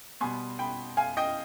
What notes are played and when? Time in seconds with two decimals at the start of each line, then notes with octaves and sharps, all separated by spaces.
0.21 B2 G3 B3 G#5 C6
0.59 G5 B5
0.97 F5 G#5
1.17 D#5 G5